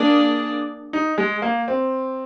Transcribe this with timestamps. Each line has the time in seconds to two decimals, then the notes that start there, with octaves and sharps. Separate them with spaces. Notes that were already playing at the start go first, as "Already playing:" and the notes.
Already playing: A#3 D4 G#4 D5
0.93 D#4
1.18 G#3
1.42 A#3
1.68 C4